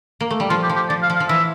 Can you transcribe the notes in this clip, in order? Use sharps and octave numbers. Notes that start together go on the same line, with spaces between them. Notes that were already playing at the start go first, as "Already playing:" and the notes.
A#3
A3
G3
F3 F4
G4
F3
G4
F3 D5
F5
F3
F5
F3
E3 E5